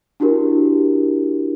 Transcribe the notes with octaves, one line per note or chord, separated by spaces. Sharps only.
D4 E4 F#4 G4 A#4